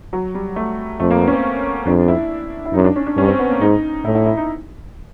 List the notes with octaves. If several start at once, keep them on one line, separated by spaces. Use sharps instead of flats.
F#3
G3
A3
F2 A3
A#3
B3
C#4
C4
F2 D4
E4
E4
F#2 D#4
D4
C#4
D4
G2 C#4
C4
B3
A#3
G#2 D#4
A2 E4
E4
E4
D#4